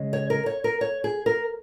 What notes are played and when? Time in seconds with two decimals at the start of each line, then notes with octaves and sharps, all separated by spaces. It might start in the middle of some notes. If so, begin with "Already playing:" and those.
Already playing: C#3 G#3
0.13 C#5
0.30 A#4
0.46 C#5
0.64 A#4
0.81 C#5
1.04 G#4
1.26 A#4